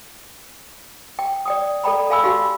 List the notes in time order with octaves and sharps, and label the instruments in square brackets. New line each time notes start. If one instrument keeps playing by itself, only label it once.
[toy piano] G5
D5 G5 D#6
A4 D5 G5 A#5 B5
A4 F5 G#5 B5 E6
D#4 F#4 G4 F5 B5